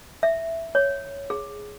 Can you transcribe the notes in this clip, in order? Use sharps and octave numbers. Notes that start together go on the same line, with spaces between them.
E5
C#5
G#4